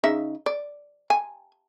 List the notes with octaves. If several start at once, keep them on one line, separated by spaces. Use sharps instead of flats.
C#3 D#4 E5
D5
G#5